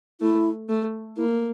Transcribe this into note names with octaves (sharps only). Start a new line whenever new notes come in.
A3 E4
A3
A#3 E4